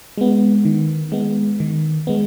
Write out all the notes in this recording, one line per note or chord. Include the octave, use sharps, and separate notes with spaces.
G#3 B3
D#3
G#3 B3
D#3
G#3 B3